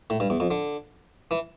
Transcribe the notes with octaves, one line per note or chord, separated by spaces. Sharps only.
A2
G2
E2
F2
D3
E3